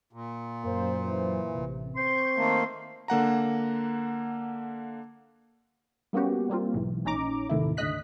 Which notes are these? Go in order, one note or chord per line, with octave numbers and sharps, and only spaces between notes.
A#2
F#2 A#3 C5
E3
A1 C3
C4 C6 C#6 G6
D#3 A3 A#3
D3 A#3 F#5 A#5
G3 A#3 B3 C#4 F#4 G4
G3 A#3 C4 F4
B1 G#2 E3
A#1 C#4 D#4 A#5 D6
D#2 A2 C3 D#3 A3 E4
G#1 D2 D3 D#5 F#6 B6